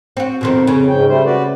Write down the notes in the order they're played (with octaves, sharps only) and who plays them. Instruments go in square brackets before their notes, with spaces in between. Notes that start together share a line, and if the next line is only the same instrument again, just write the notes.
[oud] C4 F#4
[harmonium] F2 [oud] B2 D#3 C4
[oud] C#3
[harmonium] G#2 G5
G3 A3 C5
F#4 B4 D5